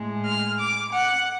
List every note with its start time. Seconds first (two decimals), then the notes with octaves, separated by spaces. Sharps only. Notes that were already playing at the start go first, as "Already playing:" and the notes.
Already playing: A2 G#3
0.25 F6
0.59 D6
0.92 F#5